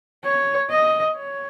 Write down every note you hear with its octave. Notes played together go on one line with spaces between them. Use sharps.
C#5
D#5
C#5